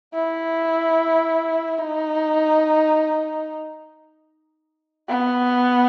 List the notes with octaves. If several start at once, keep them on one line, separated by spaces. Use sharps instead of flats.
E4
D#4
B3